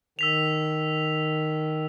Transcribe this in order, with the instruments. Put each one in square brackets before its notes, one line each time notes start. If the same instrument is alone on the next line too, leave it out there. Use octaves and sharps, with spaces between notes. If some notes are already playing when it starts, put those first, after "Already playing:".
[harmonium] D#3 [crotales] E6 B6 F7